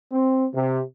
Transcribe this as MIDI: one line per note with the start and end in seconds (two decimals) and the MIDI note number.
0.12 0.46 60
0.54 0.81 48